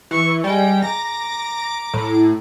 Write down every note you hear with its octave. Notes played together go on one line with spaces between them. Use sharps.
E3 C#6
G3 G#3 G5
A#5 D6 A#6
A2